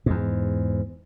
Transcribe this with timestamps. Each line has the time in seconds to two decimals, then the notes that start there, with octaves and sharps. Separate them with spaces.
0.06 E2 G#2